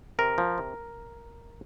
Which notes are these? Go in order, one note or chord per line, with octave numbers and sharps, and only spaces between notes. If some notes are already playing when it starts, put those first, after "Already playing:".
C3 A#4
F3
C3